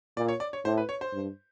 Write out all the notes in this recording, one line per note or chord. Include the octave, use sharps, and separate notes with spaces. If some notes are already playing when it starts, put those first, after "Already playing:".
A#2 D5
C#5
D5
C#5
A2 C5
B4
C#5
C5
G2